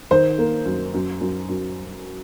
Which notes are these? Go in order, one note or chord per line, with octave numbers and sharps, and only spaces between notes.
D#3 C5
A#3
F#2
F#2
F#2
F#2